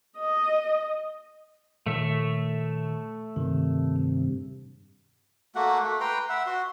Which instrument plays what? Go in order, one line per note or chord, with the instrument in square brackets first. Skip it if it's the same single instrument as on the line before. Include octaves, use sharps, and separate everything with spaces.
[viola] D#5
[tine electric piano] A#2 D#3 [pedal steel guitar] A3 C#5 E5
[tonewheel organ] G2 C3 [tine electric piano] D#3
[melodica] A3 A#3 F#4 F#5
A3
B4 G5 A#5 C6
E5 F#5
F#4 C6